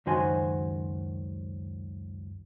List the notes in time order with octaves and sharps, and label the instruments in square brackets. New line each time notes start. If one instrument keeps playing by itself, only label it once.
[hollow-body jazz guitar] C#2 F#2 D#3 F#4 C5 G#5